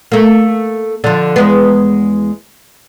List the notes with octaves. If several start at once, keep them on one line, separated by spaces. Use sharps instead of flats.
A3 A#3
D3 F3
E2 G#3 B3